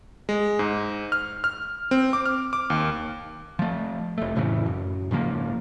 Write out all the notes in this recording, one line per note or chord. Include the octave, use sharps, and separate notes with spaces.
G#3
G#2
F6
F6
C4
D6
F6
D6
D#2
F3 A3
F1 A3
F2 A2 C#3 E3
F#2
G#2 C#3 F3 A#3